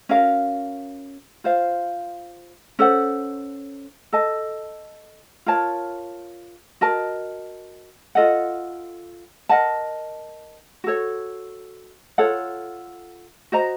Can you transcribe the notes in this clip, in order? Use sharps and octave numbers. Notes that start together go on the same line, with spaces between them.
C#4 F#4 A#4 F5
F4 C5 F5
C#4 A4 C5 F#5
A4 D#5 A5
F4 A#4 C#5 A5
F#4 A#4 D#5 A5
F4 A4 D#5 F#5
A#4 D#5 F#5 A5
F#4 A4 C#5
F4 A4 C#5 F#5
F#4 C5 D#5 A#5